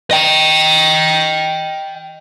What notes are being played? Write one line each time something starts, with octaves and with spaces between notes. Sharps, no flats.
D#5 G5